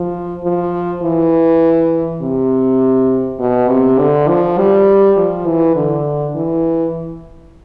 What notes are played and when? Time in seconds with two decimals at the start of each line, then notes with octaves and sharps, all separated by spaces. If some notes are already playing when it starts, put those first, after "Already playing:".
Already playing: F3
0.44 F3
1.03 E3
2.22 C3
3.40 B2
3.69 C3
3.99 D3
4.28 F3
4.58 G3
5.17 F3
5.47 E3
5.76 D3
6.35 E3